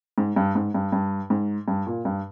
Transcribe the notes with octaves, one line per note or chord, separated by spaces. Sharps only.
G#2
G2
G#2
G2
G2
G#2
G2
A#2
G2